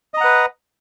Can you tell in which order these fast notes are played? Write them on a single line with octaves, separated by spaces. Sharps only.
D#5 A#5 F#5 B4